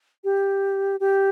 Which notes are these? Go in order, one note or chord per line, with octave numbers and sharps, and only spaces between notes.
G4
G4